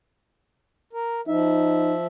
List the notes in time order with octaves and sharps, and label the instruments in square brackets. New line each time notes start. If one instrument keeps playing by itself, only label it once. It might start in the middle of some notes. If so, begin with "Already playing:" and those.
[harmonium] A#4
[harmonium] F3 E5 [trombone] D#4